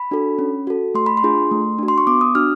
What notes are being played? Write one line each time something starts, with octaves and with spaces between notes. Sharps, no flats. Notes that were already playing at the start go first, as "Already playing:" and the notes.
Already playing: B5
D4 F#4 A4
C#4
F#4 A4
A3 C6
B5
C6
D4 F4 G#4
A3
D4 F#4
C6
C#6
B3 D6
D#6
D4 F#4 F6